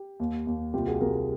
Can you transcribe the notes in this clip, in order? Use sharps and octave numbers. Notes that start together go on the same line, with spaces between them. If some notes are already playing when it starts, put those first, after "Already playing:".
Already playing: G4
D#2
D#2
C2 F4 G4
F#4 G#4
C2 G#4 A#4